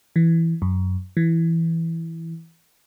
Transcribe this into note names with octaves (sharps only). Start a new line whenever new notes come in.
E3
F#2
E3